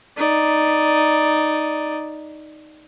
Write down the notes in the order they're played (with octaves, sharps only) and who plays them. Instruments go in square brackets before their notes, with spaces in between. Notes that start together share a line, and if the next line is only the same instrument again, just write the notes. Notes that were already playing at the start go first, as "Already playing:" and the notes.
[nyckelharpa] D#4 D5